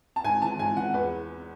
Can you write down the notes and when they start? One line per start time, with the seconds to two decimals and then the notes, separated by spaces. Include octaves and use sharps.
0.16 A5
0.24 G#2 G#5
0.42 E3 A5
0.59 G#2 G#5
0.76 E3 F#5
0.94 E2 B4